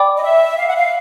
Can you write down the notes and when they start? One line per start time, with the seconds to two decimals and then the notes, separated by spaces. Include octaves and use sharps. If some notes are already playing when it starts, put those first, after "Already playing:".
Already playing: D5 G5 B5 D6
0.17 D#5
0.22 E5
0.58 F5
0.67 F#5
0.76 F5